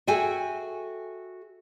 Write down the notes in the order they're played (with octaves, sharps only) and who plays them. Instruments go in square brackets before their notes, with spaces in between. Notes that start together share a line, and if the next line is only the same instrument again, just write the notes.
[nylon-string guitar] F#4 G#4 A4 E5 G5 G#5